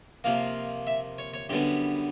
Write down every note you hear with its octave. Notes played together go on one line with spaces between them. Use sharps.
C3 F3 A#3 F5
E5
C#5
C#5
F#2 D3 G3 B3 G4